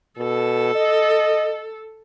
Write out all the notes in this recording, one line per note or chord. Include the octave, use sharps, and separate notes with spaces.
B2 A4
D#5